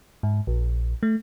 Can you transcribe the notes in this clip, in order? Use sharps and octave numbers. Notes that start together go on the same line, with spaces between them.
G#2
A#1
A3